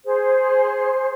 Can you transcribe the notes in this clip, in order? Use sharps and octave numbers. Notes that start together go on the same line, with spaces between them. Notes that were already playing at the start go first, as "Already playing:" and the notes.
G#4 C5